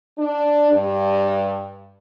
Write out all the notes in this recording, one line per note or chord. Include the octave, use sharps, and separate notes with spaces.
D4
G2